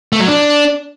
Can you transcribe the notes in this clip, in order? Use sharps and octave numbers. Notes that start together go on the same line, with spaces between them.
A3
F#3
D4